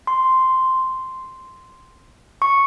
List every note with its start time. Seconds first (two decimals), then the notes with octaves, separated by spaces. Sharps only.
0.07 C6
2.42 C#6